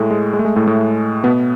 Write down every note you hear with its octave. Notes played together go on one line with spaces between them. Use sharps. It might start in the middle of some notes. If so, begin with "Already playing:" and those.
Already playing: A2 G#3 A3
G#3
G#3
A3
G#3
A2 A3
A2 A3
B2 B3